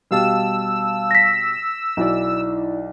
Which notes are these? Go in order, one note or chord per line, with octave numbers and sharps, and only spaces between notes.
B2 G3 G4 F5 A5 E6
A#6 B6
B1 D#4 E4 D5